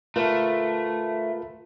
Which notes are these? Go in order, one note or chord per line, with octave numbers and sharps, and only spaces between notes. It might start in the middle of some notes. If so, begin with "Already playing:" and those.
A3 F4 A#4 B4